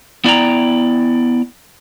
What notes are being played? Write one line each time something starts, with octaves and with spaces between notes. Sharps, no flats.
B3 E4 D5 F5 G5 A#5